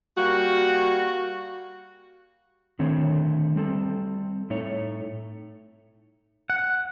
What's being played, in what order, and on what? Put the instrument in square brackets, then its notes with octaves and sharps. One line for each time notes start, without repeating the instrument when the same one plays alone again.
[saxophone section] G3 A#3 F#4
[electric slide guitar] D3 D#3 A3 C4 C#5
G3 C4 A4
A2 A3 D#4 C#5
[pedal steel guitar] F#5